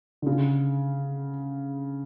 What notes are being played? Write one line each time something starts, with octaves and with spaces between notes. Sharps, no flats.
D3
C#3